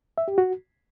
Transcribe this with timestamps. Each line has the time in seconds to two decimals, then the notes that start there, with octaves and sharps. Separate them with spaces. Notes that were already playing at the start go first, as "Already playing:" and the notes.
0.18 E5
0.28 G4
0.38 F#4